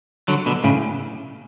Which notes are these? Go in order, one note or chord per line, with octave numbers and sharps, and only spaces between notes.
D3 F#3
B2 D3
A2 C#3